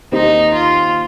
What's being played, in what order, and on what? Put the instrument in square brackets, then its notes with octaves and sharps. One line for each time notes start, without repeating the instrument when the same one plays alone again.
[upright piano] D#2 D#3 C4 G4 [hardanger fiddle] D#4
[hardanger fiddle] F4